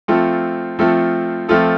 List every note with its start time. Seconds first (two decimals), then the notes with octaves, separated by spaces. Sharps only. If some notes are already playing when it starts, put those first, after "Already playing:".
0.08 F3 A3 C4 F4 A4
0.79 F3 A3 C4 F4 A4
1.48 F3 A3 C4 F4 A4